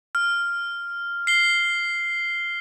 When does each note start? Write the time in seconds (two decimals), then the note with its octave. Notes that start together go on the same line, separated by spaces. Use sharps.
0.15 F6
1.27 C7 G7